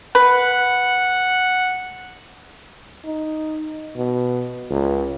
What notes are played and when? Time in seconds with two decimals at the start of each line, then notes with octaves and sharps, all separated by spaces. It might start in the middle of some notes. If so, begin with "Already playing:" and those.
0.15 B4 F#5
3.05 D#4
3.96 B2
4.71 C#2